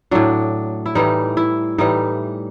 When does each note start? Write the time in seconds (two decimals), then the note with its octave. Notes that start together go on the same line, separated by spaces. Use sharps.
0.11 A2 F#3 D4
0.86 E4
0.95 A2 E3 G3 D#4
1.37 E4
1.78 A2 E3 G3 D#4